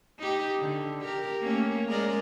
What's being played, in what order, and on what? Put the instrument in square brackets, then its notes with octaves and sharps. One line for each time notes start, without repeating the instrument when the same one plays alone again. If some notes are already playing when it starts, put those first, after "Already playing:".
[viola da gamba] D#4 G4
D3
G4 A#4
A3 A#3 C#4
G#3 A#4 D5